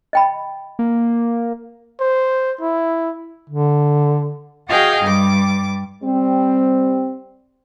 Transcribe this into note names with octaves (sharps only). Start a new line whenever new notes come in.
D#5 G5 B5
A#3
C5
E4
D3
F#4 G#4 D#5 F5 G5
G2 G3 D6
G3 C4